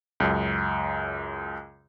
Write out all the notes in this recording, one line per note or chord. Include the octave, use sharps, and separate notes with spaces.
C#2 F#2